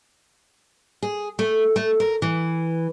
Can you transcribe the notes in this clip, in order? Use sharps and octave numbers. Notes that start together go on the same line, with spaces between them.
G#4
A3
A3
A#4
E3